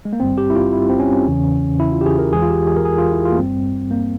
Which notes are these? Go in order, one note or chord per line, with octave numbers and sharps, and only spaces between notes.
G#3
A#3
G#1 G2 G3 C4
G4
E4
F4
E4
C4
C#4
E2 C#3 E3
E4
F4
G4
G#4
A#4
E2 E3 G#3 G#4
F4
G4
G#4
A#4
G#4
F4
E4
F4
A#3
G#1 G2 G3 C4
A#3